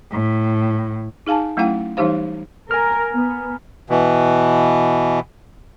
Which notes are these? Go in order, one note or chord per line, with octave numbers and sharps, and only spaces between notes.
A2
D#4 G#4 F5 G#5 A5
F#3 A3 C#4 E4 F5 G5
E3 G3 D#4 G4 C5 F5
A#4 G#5 A#5 F6
B3
B2 E3